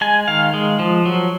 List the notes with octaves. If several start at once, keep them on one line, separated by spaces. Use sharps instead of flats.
G#3 G#5
D#3 F5
G#3
F3
F#3